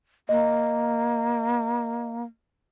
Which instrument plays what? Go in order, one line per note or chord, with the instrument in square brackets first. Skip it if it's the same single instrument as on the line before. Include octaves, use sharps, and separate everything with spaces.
[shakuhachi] A#3 [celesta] D#5